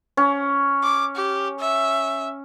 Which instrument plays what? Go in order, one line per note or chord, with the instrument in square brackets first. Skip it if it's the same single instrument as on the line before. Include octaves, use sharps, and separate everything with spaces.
[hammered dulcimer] C#4
[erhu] D6
G4
E5